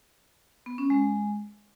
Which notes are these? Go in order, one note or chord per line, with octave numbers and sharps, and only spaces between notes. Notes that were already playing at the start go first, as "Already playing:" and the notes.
B3
C#4
G#3